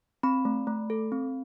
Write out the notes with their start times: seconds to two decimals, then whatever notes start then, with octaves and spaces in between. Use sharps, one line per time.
0.23 C4 B5
0.45 A3
0.67 A3
0.90 A4
1.12 C4